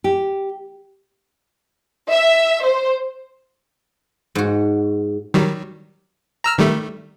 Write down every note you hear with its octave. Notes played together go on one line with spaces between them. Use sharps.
G4
E5
C5
G#2 F#4
D#3 F#3 G3
A#5 E6 F6
D#3 G3 A3